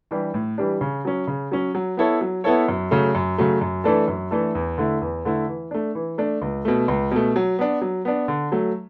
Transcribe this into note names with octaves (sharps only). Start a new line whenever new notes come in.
E3 G3 D4 G4
A2
E3 G3 D4 G4
C#3
F#3 C#4
C#3
F#3 C#4
F#3
B3 E4 A4 C#5
F#3
B3 E4 A4 C#5
F#2
C#3 F#3 A3
F#2
C#3 F#3 A3
F#2
E3 A3 D4 A4
F#2
E3 A3 D4 A4
E2
D3 A3 E4
E2
D3 A3 E4
E3
A3 D4
E3
A3 D4
C#2
B2 A3
C#2
B2 A3
F#3
B3 D4
F#3
B3 D4
D3
F#3 A3